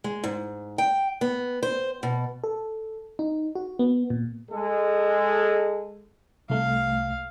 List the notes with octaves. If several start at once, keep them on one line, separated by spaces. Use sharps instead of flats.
G#3
G#2
G5
B3
C5
B2
A4
D#4
F#4
B3
A#2
G#3 A4
C2 A3 F5